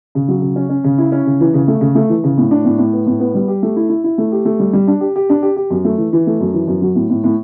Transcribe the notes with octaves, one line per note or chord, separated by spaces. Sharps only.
C#3
F#3
C#3
C#4
C#4
C#3
E4
C#4
C#3
E3
C#3
A3
C#3
A3
E3
C#3
A2
D4
A2
A2
B3
A2
B3
G3
G4
A3
E4
E4
E4
A3
G4
A3
G3
G3
D4
G4
G4
D4
G4
G4
F#2
A3
E3
E3
A3
F#2
E3
F#2
F#3
A2
A2
A2